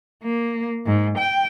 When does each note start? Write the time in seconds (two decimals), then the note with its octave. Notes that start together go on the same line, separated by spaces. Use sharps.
0.23 A#3
0.86 G#2
1.18 G5